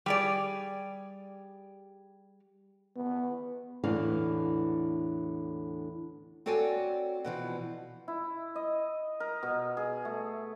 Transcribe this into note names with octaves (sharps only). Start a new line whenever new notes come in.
G3 G#4 D5
B3
E2 A2 D3 E3 D4 F5
C4 F#4 A4 C#5 D5 G#5
B2 E3 F3
E4
D#5
A#4
B2
G#4
A3